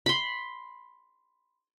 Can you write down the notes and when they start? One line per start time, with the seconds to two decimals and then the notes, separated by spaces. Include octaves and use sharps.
0.06 B5 C6